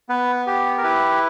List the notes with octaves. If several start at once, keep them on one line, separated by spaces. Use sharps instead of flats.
B3 B4
G4
A#4
E4 B4